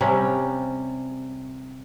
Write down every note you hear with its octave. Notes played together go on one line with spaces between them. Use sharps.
C3 G3 C#4